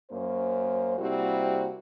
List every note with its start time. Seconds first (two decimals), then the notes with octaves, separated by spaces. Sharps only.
0.11 F#2 A#3 C#4 C5
0.99 C3 G3 A#3 C4 E4 F#4